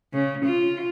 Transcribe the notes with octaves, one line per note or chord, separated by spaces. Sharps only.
C#3
F4